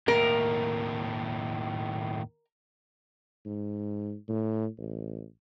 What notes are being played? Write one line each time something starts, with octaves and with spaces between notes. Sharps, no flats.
D#2 A2 A#4
G#2
A2
A1